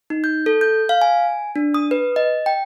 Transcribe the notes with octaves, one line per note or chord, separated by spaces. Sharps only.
D#4
G6
A4
G6
F5
G#5
D4
D#6
B4
D#5
G5